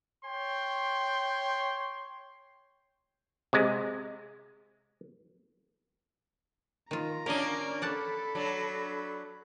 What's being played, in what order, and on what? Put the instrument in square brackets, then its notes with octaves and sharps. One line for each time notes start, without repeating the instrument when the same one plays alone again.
[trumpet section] C#5 G5 C6
[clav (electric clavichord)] C3 G#3
[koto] D#3 F4 [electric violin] A#5
[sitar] A#3 C#4 D4 [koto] A#4 D#5
[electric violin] A4 B5 [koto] D5 F#5 A5
[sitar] F#3 D4